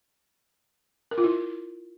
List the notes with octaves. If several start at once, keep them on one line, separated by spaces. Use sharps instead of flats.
A#4
F4
E4